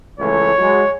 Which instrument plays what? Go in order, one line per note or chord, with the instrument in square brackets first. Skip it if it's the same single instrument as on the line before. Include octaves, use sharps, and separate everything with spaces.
[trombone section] C#2 E3 A3 [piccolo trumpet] C#5
[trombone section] F#3 G#3